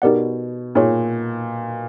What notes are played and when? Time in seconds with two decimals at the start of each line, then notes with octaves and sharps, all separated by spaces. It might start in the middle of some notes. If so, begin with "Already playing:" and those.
0.02 B2 D#4 G4 A#4 D5 F#5
0.75 A#2 D#4 G#4 C#5